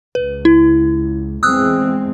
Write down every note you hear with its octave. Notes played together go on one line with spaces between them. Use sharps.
C#2 B4
E4
E2 G#3 C4 D#6 E6 F#6